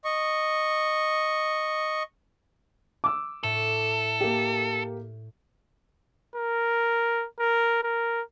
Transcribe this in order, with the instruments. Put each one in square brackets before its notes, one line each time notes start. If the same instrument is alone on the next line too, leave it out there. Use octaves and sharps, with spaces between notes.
[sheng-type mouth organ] D#5 C#6
[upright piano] D6 E6
[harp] A2 [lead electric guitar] A4
[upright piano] A#3 G4
[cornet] A#4
A#4
A#4